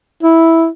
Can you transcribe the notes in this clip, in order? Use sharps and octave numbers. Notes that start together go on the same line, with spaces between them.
E4